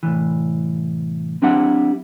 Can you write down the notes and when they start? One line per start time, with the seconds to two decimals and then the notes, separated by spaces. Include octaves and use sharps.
0.03 C2 A2 E3
1.42 F#3 C4 D4 E4 G4 F#5